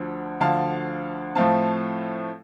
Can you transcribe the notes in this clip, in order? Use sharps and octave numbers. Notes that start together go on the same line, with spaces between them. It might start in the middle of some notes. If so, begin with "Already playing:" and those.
Already playing: D2 D3 F3
D2 D3 F3 F5 A5
A2 F3 A3 C4 F5 A5